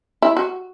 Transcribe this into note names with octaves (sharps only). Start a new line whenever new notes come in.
E4
F#4